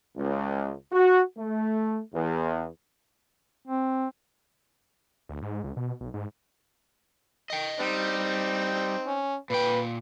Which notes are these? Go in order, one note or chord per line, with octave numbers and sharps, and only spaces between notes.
C#2
F#4
A3
E2
C4
D2
G#2
C#2
B2
B1
G#2
D#5 G5
G3 C4 D#4
C#4
A#2 B4 G5